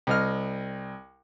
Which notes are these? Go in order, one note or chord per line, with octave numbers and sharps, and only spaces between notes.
C2 D#5 F6